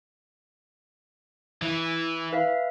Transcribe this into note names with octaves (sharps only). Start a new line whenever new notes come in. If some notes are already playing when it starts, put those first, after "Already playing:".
E3
B4 E5 F5